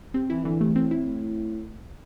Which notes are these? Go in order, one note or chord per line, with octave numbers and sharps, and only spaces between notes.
C3 C4
E3 E4
D3 E3
C3 A3
A2 C4
E4